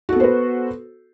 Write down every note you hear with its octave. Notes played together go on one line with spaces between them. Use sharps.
B3 F#4 A4 B4 C5